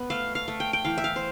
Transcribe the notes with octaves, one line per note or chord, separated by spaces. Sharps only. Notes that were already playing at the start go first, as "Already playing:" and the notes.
Already playing: B3
A3 F5
F5
A3
G5
G5
E3 F5
E5
F5
C5